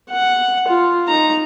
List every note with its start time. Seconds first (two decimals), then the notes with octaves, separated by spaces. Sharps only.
0.10 F#5
0.68 F4
1.08 D#4 A#5